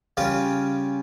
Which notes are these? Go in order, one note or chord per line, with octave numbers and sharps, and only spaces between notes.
C#3 G3 C#4 F4